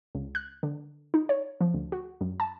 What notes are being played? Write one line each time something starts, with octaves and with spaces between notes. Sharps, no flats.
C#2
F#6
D3
D#4
C#5
F3
D2
F#4
F#2
A5